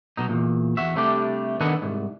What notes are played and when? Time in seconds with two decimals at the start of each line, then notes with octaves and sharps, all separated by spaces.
0.17 B1 B2 D#4
0.29 E2 G2 A#2
0.77 E2 F#4 E5
0.96 C3 G3 A3 D4 G4
1.61 D#3 B3 D4 A4 D#5 F#5
1.82 C2 G#2